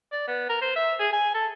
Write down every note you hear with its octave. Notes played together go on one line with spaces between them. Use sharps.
D5
B3
A#4
C5
E5
G#4
G#5
A4